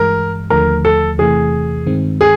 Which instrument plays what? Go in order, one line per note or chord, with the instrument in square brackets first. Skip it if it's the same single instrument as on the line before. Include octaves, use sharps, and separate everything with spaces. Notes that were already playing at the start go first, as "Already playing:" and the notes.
Already playing: [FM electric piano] G2 E3 G#3 [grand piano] A#4
[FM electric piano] D#2 D3 F3 A3 [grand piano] A#4
[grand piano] A4
[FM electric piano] E2 C3 E3 A3 [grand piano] G#4
[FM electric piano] G2 D#3 G#3 C4
[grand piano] G#4